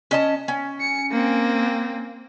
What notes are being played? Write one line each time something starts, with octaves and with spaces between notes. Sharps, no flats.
C#4 D#5 A5
C#4
C#7
A#3 C4